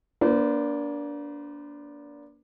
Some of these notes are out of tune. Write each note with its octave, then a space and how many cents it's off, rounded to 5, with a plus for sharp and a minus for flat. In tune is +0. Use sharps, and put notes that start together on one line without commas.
A#3 +30 D4 -20 C5 -45